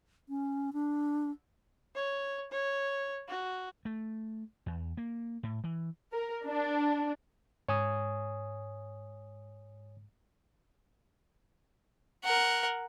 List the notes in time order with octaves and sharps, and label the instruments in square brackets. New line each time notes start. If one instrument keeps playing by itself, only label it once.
[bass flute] C#4
D4
[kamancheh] C#5
C#5
F#4
[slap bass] A3
E2
A#3
A2
E3
[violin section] A#4
D4
[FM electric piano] G#2 [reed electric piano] C#5 G#5 D#6
[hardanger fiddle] A#4 F#5